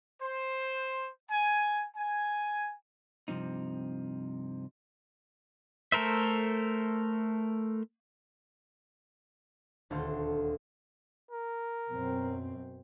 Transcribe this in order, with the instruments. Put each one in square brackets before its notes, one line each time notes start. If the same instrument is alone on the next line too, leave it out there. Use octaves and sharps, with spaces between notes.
[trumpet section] C5
G#5
G#5
[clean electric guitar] G2 C3 F3 C4 D#4
[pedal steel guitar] A3 A4 A#4 C5 E5
[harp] D#1 D2 A4 F5 C6 G6
[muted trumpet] A#4
[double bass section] F#2 B2 C4